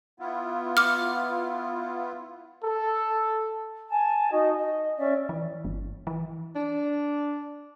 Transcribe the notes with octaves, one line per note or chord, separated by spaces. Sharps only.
B3 E4 F4
D6 F6
A4
G#5 A5
D#4 F#4 D#5
D#5
C#4 D5 E5
E3
G1
E3
D4